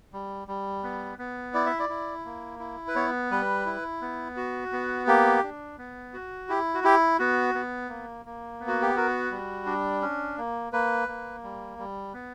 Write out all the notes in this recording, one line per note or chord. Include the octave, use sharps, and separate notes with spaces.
G3
G3
B3
B3
E4 D5
E5
D5
E4
A#3
E4
B4
B3 C#5
G3 B4
E4
B3
F#4
B3
A#3 G4
D4
B3
F#4
E4 G4
F#4
E4 G4
B3 F#4
B3
A#3
A#3
B3
F#4
G4
F#4 A#4
G3
D4
C#4
A#3
A#3 B4
A#3
G3
G3
B3